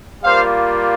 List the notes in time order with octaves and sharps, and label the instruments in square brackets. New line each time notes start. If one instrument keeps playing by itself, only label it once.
[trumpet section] G3 A#3 F4 C5 F5